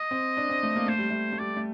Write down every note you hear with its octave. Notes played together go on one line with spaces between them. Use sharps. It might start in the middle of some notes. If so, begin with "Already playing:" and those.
Already playing: D#5
C4
D4
C4
A3
A#3
A3 C5
G3
A3
A3
G3 D5
A3